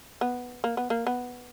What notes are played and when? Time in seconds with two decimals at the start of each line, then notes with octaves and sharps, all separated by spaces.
0.21 B3
0.64 A#3
0.77 B3
0.90 A#3
1.07 B3